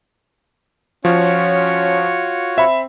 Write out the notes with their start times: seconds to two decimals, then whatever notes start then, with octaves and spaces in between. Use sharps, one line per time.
1.05 F3 C#4 F4 F#4 C#5
2.58 C4 E5 B5